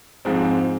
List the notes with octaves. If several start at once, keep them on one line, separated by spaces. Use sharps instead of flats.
G#2 F3 G#3 C4